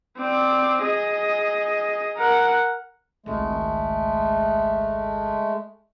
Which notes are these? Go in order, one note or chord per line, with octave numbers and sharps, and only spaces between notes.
C4 D5
G#4 D#5
A#4 F#5
G#1 C#2 G#3 A3